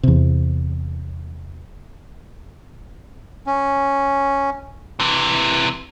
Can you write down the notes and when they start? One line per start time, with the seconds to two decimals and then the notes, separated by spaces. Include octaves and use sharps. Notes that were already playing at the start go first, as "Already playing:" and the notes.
0.03 E2 C3
3.47 C#4
5.00 C3 E3